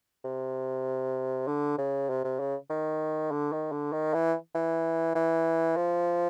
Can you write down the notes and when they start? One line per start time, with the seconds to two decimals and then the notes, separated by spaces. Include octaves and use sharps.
0.25 C3
1.47 D3
1.78 C#3
2.09 C3
2.24 C3
2.39 C#3
2.69 D#3
3.31 D3
3.52 D#3
3.72 D3
3.92 D#3
4.13 E3
4.55 E3
5.15 E3
5.76 F3